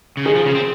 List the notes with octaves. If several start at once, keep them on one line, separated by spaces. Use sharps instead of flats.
C#3
D#3 G#4
F3
C#3
C4